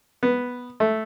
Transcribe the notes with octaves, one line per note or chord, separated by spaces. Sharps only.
B3
A3